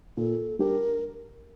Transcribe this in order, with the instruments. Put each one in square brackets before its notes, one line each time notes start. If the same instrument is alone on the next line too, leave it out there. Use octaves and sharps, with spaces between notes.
[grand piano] A#2 [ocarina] A4
[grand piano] G3 D4 G4 [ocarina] A#4